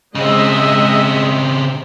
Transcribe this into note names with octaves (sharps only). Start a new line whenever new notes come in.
C#3 G#3 C4 D#5 E5